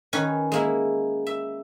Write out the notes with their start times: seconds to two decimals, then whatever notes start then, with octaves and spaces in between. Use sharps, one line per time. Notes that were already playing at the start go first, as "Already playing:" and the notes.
0.13 D#3 C#4 B4
0.52 G#3 A#3 E4
1.27 E5